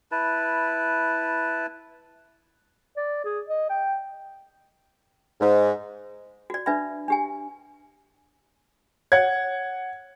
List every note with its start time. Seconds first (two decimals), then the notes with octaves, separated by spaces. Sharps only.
0.12 E4 B4 A5
2.97 D5
3.25 G#4
3.48 D#5
3.70 G5
5.41 G#2
6.50 F#4 D5
6.66 D4 B4 D5 E5 B5
7.08 D4 G4 G#5
9.12 C#5 F#5 G#6